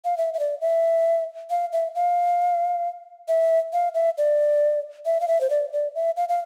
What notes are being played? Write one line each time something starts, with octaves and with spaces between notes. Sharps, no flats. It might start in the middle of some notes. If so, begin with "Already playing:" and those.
F5
E5
E5
D5
E5
F5
E5
F5
E5
F5
E5
D5
E5
F5
E5
C5
D5
D5
E5
F5
F5